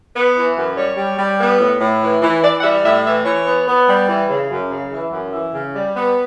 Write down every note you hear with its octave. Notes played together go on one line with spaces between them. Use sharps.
B3
E3
F#2
G3 C#5
G3
G3
B3
A2
A2
E3
E3
E3 D5
F#5
G3 E5
A2 E5
E3 E5
E3 C#5
B3
B3
G3
E3
C#3
F#2
C#3
E3
F#2
E3
C#3
G3
B3